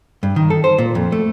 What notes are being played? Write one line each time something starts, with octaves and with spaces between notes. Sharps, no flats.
G2
D#3
A4
C5
A#2
F2
A3